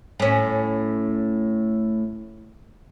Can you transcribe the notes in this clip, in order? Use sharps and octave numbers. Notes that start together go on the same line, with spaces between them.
A2 C#4